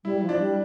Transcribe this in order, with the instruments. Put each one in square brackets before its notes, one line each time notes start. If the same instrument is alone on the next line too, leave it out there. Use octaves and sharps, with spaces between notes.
[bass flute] G3 [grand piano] E4
[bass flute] F3
[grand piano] D4
[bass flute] G3